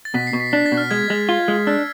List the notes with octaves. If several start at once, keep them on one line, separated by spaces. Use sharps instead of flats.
A6
B2 B6
C7
B2
B6
D4 B6
A6
B2
F6
G#3 G#6
G#3
F4
G#3
D4 E6